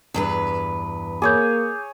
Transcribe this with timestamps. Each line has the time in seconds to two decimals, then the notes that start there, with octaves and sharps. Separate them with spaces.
0.14 E2 G2 B4
1.22 A#3 G#4 C#5 D6 G6